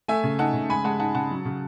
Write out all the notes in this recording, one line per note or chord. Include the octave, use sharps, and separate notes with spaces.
A3 E5 G#5
C#3
D#4 F#5 A5
C#3
G#3 G#5 B5
G#3 F#5 A5
D#4 F#5 A5
C#3 F#5 A5
F#3
C#3